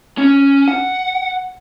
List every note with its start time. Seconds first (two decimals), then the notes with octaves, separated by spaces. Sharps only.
0.18 C#4
0.68 F#5